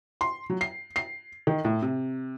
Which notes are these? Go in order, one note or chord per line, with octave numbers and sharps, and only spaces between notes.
C6
F#3
C7
C7
D#3
A2
C3